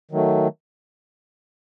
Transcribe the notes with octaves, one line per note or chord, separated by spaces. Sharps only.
D#3 F#3 A3